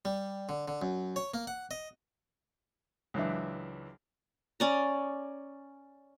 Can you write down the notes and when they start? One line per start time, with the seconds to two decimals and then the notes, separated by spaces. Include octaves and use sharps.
0.05 G3
0.49 D3
0.68 D3
0.82 F#2
1.16 C#5
1.34 A#3
1.47 F#5
1.71 D#5
3.14 C#2 F#2 E3 D4 E5
4.60 C#4 D5 A#5